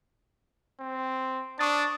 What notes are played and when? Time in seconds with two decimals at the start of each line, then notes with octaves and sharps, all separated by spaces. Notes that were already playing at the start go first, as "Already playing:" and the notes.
0.80 C4
1.59 D4 C#6 D#6 A6